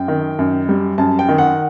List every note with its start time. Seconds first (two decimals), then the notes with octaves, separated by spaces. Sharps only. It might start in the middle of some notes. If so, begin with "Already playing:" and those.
Already playing: F#2 G5
0.08 D#3
0.39 F#2
0.69 G3
0.98 F#2 A5
1.19 G5
1.29 D#3
1.38 F#5